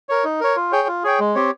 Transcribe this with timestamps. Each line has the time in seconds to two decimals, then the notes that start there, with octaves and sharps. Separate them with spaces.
0.09 A#4 C#5
0.24 D#4
0.40 A#4 C#5
0.56 F4
0.72 G#4 C#5 G5
0.88 F4
1.04 G#4 C#5 G5
1.20 G#3
1.35 C4 G4 C#5